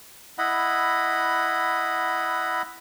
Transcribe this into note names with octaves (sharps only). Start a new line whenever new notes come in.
E4 D#5 F#5 B5